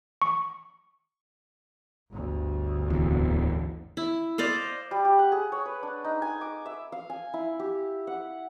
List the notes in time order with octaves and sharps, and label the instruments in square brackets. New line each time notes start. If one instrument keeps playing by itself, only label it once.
[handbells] C#6
[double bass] G1 D2
[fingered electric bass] D1 E2
[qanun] E4
C5 D5 D#5 F5
[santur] G3
G4
F#5
G#4
C#5
B4
D4
D#4
G#5
D6
E5
F5
G#5
E4
G4
F#5